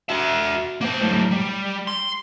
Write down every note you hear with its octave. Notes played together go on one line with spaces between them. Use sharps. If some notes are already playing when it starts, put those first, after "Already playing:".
F#4 E5
A#3 C5
A2 F#3
G3
C6